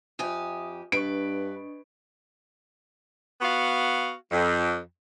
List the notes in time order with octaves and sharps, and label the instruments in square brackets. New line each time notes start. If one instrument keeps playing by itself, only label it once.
[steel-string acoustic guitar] F2 G4 G#5 [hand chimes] E5 D#6
[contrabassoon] G2 [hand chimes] D4 D#5 C#6 [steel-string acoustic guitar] B4 [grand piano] D7
[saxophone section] B3 F#4 F5
F2